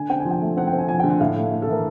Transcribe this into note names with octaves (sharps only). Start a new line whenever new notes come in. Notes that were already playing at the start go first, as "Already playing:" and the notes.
Already playing: D3 G#5
C4 G5
G#5
F3
G5
A3
C4 F#5
G5
C4
G#5
F3 G#5
G5
D3
F#5
A2 F5
A3
A3
A4
E3 A#4